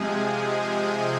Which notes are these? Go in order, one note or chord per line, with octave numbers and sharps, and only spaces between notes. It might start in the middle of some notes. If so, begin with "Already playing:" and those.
Already playing: C3 F3 G#3 G#4